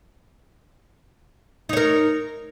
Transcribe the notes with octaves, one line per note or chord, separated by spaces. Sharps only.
D#4 A#4 C#5